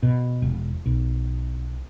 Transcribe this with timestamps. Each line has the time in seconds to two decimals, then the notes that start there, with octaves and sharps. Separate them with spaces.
0.03 B2
0.42 E1
0.86 B1